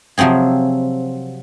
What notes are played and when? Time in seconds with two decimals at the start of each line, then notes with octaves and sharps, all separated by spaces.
0.18 C3 F3 F#3 C4 G#4